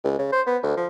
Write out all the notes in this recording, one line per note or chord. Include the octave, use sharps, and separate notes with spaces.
C#2
C#3
C5
B3
D2
F3